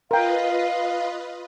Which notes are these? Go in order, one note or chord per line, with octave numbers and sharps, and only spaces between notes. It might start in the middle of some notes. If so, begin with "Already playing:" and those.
F4 A#4 B4 D#5 F5 G5